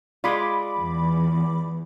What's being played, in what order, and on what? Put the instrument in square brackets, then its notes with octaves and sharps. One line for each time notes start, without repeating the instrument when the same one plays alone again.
[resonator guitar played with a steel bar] G#3 F4 [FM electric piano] D5 B5 D6
[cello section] E2